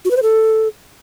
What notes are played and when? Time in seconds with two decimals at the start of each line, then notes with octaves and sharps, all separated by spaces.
0.05 F#4
0.11 B4
0.17 C5
0.23 A4